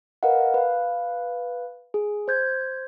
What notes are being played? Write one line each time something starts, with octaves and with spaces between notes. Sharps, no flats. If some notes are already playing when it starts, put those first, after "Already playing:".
A#4 B4 D#5 F5 F#5
B4 F5
G#4
C5 G6 G#6